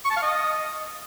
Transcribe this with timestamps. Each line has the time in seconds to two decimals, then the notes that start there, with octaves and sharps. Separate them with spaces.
0.05 C#6
0.11 A5
0.16 F5
0.22 D#5